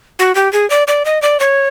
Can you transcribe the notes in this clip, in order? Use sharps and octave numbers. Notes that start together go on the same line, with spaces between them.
F#4
G4
G#4
D5
D5
D#5
D5
C#5